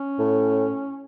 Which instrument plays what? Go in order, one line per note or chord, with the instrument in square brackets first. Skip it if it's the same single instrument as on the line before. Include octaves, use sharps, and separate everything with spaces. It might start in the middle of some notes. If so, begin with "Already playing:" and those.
Already playing: [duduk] C#4
[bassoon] A2